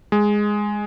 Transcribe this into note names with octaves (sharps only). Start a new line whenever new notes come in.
G#3